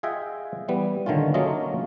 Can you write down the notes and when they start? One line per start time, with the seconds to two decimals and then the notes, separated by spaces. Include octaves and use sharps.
0.03 F4 G#4 D#5 E5 F#5 G5
0.68 E3 G3 B3
1.06 D3 D#3 A3 C#4 F4
1.34 F#3 A3 A#3 C#4 F4 D#5